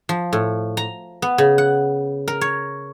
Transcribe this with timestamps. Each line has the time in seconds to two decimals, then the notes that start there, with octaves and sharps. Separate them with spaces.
0.09 F3
0.33 A2
0.77 A#5
1.22 B3
1.38 C#3
1.58 F#5
2.28 A#4
2.41 C#5